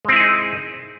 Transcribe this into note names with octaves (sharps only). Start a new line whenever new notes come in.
G#3 C4 D#4 E4 G#4